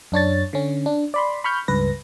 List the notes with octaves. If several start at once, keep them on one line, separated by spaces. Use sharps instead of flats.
F#2 D4 C#5 A6
D3 C#4
D4
D5 B5 C6
B5 C#6 F6 G6
C#2 G2 B4 A#6